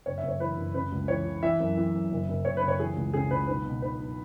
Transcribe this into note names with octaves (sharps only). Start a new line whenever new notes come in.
F#1 C#5
E5
F#1
C#5
E3 B4
F#1
C#3 B4
C#2
E3 C#5
E3
E3 E5
F#2
E3
F#2
F#1
F#1
F#1 C#5
B4
F#1
C#5
E3 G#4
C#2
C#3 G#4
C#2 B4
B1 B4
B2
B1 B4
B1